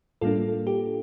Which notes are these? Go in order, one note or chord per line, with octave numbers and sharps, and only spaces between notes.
A2 G3 A#3 D4 F4 A4
G4